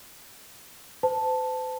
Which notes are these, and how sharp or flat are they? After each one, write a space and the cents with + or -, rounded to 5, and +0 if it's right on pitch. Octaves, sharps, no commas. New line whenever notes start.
C5 -45 A5 +0